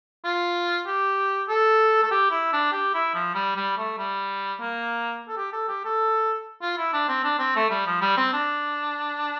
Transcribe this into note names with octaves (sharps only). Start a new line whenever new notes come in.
F4
G4
A4
A4
G4
E4
D4
G4
E4
F3
G3
G3
A3
G3
A#3
A4
G4
A4
G4
A4
F4
E4
D4
C4
D4
C4
A3
G3
F3
G3
C4
D4